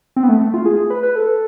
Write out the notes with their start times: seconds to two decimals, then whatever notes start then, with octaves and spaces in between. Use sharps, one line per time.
0.16 C4
0.23 B3
0.29 A3
0.41 A3
0.54 F4
0.65 G#4
0.90 B4
1.03 B4
1.16 A4